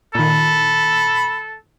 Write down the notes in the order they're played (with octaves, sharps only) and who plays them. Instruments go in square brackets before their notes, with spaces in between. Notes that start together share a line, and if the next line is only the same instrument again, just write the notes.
[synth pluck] A#2 D#3 [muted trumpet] A4 [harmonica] B5